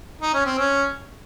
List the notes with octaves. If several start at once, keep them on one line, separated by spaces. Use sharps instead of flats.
D#4
C#4
C4
C#4